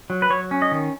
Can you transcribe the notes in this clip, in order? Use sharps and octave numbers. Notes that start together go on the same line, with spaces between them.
F#3
B4
F#3 C#5
C#4
D#5
D#3